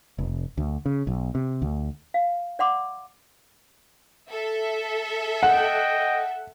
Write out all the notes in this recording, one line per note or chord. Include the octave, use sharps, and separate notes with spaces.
F1
D2
C#3
B1
C3
D2
F5
D5 F#5 C6 D6
A4 E5
D#5 F#5 G5